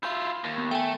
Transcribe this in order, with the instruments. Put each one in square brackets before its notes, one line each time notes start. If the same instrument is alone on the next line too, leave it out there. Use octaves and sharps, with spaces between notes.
[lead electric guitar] E4 F4 [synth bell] G6
[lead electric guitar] D#2
[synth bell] B3
[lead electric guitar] A3 [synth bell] G5 G#5